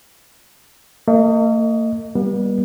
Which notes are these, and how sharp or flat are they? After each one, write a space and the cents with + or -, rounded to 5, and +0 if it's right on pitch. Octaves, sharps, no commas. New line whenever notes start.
A#3 -45 D#5 +0
G3 +10 B3 -40